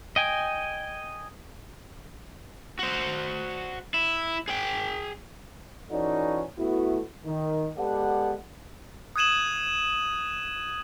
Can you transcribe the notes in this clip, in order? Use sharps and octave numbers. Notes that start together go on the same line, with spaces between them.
D#5 G5 G#5
F#4 C5
E4
G#4 G5
E3 C#4 D#4 F#4 A4 D5
A3 B3 E4 F#4
D#3
G#3 B3 G4 A4 D5 F#5
D#6 F#6 G#6 D#7 E7 F#7